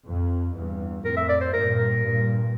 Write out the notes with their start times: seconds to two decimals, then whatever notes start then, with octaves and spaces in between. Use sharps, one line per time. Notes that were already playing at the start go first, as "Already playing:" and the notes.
0.08 F2
0.55 E2 G2
1.04 F2 A2 A#4
1.17 E5
1.29 D5
1.41 C5
1.52 G2 A#2 A#4
1.77 A#4
2.01 G2 A#2